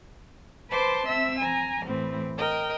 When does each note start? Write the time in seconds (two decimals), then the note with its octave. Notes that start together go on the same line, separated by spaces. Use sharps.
0.71 B4 C5 A5 C6 D6
1.07 C4 E5 E6
1.40 G#5 A#5
1.84 A2 E3 C4
2.37 A#4 D#5 G5